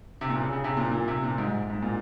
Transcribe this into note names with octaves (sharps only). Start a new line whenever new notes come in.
C3
A#2
C#3
C#3
C3
A#2
A#2
C3
A#2
G#2
G#2
A#2